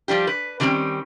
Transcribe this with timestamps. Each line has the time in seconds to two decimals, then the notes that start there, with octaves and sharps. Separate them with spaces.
0.08 F3 G3 D4 G4
0.27 B4
0.60 D3 D#3 F#3 G3 C4 C#4